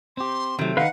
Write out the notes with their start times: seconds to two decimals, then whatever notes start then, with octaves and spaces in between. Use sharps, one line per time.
0.17 C4 G4 C6
0.59 C3 D#3 F#3 A3
0.77 D#3 D#4 B4 F5 F#5